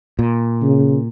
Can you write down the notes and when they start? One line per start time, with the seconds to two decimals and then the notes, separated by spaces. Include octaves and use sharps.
0.19 A#2
0.62 C#3